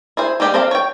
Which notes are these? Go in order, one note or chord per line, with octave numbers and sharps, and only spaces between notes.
E4 G#4 C5
G3 A#3 G4 G#4 D#5
C4 A4 A#4 E5 F5
C#5 G5